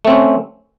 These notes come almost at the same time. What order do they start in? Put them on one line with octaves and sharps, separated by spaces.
A3 C4 C#4